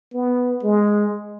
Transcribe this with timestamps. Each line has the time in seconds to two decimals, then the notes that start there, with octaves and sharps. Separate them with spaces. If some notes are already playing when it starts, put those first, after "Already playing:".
0.14 B3
0.63 G#3